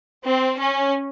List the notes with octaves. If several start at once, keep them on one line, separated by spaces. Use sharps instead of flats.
C4
C#4